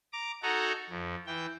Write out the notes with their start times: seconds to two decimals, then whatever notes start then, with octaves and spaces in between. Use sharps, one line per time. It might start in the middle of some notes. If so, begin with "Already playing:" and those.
0.13 A#5 D6
0.43 D#4 F#4 A4 F#5 G#5 A#5
0.90 F2
1.27 E3 G5